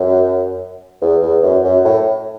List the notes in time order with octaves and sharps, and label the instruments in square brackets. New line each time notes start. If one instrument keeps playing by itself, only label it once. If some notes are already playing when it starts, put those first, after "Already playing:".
Already playing: [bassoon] F#2
E2
E2
F#2
F#2
A2